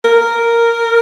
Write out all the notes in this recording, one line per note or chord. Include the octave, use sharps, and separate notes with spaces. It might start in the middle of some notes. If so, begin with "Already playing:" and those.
A#4